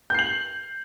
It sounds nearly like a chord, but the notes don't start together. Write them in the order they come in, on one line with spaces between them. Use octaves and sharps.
G6 C7 F#7